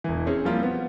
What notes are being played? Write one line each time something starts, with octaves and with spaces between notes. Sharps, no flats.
E1 E3
C4 C#4 G#4
F3 G3 A#3 C4 F4 A#4
B3